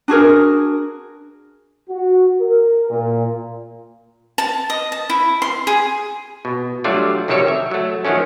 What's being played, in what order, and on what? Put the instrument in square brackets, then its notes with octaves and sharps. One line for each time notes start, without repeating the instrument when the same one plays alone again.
[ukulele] D4 F#4 G#4 A#4
[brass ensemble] F#4
A#4
A#2
[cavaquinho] A5
D#5
A5
E4
C6
G#4
[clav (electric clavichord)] B2
F#3 G3 A3 D4 F4 D5
C2 D#3 F#3 G3 A4 C#5
E5
F#3 A3
D#3 F3 F#3 A3 C#4